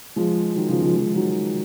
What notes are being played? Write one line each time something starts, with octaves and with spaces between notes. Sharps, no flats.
F3 G#3
D#3 F#3
C#3 F3
F3 G#3
F3 G#3
D#3 F#3